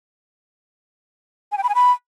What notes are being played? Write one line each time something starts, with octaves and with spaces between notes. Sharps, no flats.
G#5
G5
B5
G#5
B5